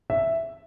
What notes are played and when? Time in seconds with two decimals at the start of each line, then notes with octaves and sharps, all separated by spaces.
0.10 E5